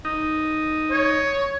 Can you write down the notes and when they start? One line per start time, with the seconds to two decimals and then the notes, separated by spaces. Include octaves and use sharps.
0.05 D#4
0.91 C#5